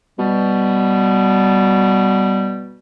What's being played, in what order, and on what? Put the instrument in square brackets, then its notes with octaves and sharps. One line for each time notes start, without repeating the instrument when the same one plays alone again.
[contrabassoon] B2 [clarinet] G3